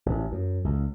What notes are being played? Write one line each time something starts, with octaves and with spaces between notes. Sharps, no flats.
A1
F#2
C#2